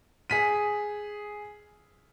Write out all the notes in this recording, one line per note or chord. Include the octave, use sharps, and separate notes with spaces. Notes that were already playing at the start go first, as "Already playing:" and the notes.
G#4 B6 D#7